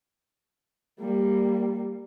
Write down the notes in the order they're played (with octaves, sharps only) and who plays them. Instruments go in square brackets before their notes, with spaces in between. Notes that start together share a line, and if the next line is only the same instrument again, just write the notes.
[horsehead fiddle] G3 A#3